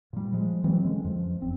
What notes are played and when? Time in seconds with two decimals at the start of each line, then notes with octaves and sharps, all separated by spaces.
0.13 A#2 G3
0.32 F3 G#3
0.64 E3 F#3 G#3 C4
0.85 D3 G#3 C#4
1.04 F2 F3
1.41 F#1 C4